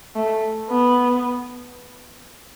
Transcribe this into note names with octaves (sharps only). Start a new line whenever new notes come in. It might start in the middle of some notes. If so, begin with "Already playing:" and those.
A3
B3